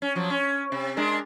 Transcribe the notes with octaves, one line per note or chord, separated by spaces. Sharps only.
C#4
F3 F#3
C#4
C3
G#3 D4 A#4